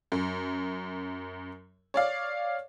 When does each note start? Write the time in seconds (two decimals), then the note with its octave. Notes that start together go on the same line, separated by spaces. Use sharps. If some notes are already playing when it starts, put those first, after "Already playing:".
0.12 F#2
1.94 C#5 D5 F5